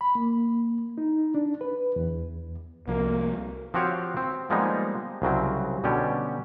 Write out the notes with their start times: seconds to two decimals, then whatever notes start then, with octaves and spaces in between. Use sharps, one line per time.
0.01 B5
0.15 A#3
0.98 D#4
1.35 D4
1.61 B4
1.96 E2
2.88 C2 F3 A#3
3.74 F3 C4 F#4 G4 C#5 F5
4.17 C4
4.50 F3 G3 G#3 A#3 B3 D#4
5.22 C2 C#3 F#3 C4
5.84 B2 D3 G3 C#4 G4